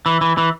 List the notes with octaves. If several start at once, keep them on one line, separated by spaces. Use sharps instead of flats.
E3
E3
E3